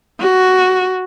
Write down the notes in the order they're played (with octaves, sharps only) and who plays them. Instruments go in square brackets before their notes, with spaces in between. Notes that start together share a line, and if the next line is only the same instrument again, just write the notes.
[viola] F#4